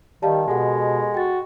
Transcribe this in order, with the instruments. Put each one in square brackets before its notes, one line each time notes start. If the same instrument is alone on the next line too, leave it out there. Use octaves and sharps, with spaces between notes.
[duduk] D#3 [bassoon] G3 [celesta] D#5 F5 A5
[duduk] B2 [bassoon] G#3 [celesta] G4 A4 F#5
[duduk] F#4 [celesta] G5 A6